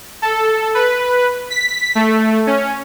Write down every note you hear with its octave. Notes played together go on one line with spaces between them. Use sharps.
A4
B4
B6
A3
C#4